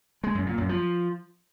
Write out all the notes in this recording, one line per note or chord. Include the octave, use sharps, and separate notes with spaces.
G#3
F#2
A#2
F#2
F3